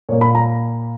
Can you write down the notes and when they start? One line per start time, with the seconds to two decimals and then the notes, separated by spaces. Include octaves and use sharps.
0.09 A#2 C#5
0.12 A#3
0.21 B5
0.35 A#5